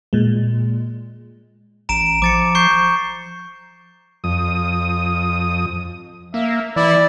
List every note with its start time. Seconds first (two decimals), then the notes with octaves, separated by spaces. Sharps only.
0.13 A#2 G#3
1.89 A1 A#5 D7 E7
2.22 F3 D6 A6 C#7
2.55 C#6 G6 C7
4.24 F2 D#6
6.34 A#3 E5
6.76 E3 E4 D5